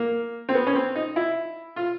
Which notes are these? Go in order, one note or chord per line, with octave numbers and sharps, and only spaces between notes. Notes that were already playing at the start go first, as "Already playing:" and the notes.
Already playing: A#3
C4
B3
C#4
C4
D#4
E4
F4